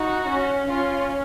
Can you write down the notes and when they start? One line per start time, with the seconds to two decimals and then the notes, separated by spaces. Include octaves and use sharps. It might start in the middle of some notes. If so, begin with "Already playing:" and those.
Already playing: D#4 F#4
0.27 C#4
0.69 C#4 F4